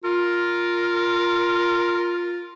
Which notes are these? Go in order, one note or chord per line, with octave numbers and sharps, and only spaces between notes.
F4 A#4